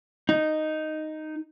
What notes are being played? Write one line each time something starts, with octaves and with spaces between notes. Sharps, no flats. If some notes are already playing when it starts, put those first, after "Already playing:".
D#4